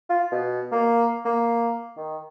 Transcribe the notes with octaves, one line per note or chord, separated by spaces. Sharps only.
F4
B2
A#3
A#3
D#3